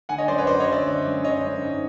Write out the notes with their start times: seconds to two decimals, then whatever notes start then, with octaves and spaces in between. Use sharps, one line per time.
0.09 D3 F#5 G#5
0.18 C#5 D#5
0.28 F#2 C5 D5
0.38 B4 C#5
0.47 F#3 C5 D5
0.60 C#5 D#5
0.67 D3
0.72 D5 E5
0.86 D3
1.05 F#2
1.24 D3 C#5 D#5
1.43 F#2
1.62 G#2